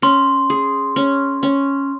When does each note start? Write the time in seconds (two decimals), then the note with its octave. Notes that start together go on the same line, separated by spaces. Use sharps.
0.02 C#4 C6
0.50 G#4
0.96 C#4
1.43 C#4